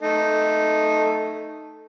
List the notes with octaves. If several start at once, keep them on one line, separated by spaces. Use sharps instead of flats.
A3 D#4 A4